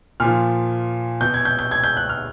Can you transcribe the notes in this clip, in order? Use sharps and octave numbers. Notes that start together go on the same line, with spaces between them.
A#2 F3 F6
B2 G6
G#6
G6
G6
G#6
G6
F#6
F6